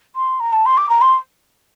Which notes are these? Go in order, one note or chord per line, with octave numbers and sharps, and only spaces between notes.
C6
A#5
A5
C6
D6
A#5
C6